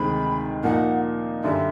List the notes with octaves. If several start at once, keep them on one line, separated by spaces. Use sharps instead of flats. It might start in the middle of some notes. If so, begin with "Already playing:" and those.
Already playing: D2 C3 D#3 G#3 C4 B5
A#2 F3 A#3 D#4 F#5
F#2 D3 G3 E5